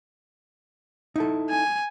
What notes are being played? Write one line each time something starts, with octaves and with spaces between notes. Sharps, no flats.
D#4 E4 A4
G#5